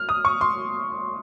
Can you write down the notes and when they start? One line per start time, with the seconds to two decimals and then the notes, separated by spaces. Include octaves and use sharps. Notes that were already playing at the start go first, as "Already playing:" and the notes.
Already playing: F6
0.09 D#6
0.25 C#6
0.41 C6